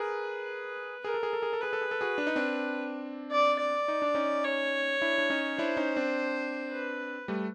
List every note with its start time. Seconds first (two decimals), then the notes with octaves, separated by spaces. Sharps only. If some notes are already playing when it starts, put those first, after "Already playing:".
Already playing: G#4 A#4 B4
1.04 G#4 A#4
1.14 A4
1.23 G#4
1.33 A4
1.42 G#4
1.53 A4
1.61 G#4 B4
1.73 A4
1.82 G#4
1.91 A4
2.01 F#4 G#4
2.18 D4
2.27 D#4
2.36 C4 D4
3.31 D5
3.59 D5
3.88 D#4
4.02 D4
4.15 C#4 D#4
4.45 C#5
5.02 D4 E4
5.18 D4
5.30 C#4 D#4
5.58 D4 E4 C5
5.77 C#4 D#4
5.96 C4 D4
6.72 B4
7.28 G3 A3